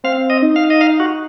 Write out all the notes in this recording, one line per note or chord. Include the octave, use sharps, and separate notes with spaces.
C4 F5
D#5
D#4
F5
D#5
F5
F#4